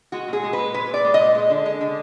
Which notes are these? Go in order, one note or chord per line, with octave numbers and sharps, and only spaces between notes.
G#3 F#4
A#2 G#4
G#3
B4
A#2
G#3 B4
A#2 D5
G#3
D#5
A#2
G#3
D3
G#3
D3